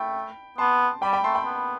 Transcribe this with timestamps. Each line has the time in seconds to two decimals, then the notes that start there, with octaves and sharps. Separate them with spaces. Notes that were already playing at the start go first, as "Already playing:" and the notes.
Already playing: A3 G5 B5
0.58 B3 A5 C6
1.02 G3 G5 B5
1.13 G5 B5
1.24 A3 A5 C6
1.35 G5 B5
1.46 B3